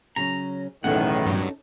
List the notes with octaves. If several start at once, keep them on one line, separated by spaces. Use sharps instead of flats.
C#3 F#3 C#4 A#5
B1 E2 A2 D#3 C#4 D#4 A4 F#5
G2 F#3